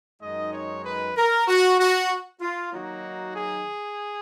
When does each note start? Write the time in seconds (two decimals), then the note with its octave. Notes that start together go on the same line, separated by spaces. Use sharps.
0.21 F#2 D#3 G#3 D#4 D#5
0.53 C#5
0.84 B4
1.17 A#4
1.48 F#4
1.79 F#4
2.41 F4
2.72 D#3 F#3 A#3 D#4 F#4
3.35 G#4